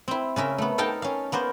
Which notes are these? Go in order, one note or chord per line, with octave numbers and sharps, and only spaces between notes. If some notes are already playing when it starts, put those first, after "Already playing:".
C4 E4
C#3 C#4 A#4 E5
A3 B3
D#4 A4 A#4 F5 G5 A5
C#4 F5
A#3 B3 A#4 C5